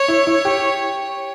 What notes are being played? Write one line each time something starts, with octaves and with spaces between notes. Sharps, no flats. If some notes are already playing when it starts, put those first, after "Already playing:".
Already playing: C#5
E4
E4
G4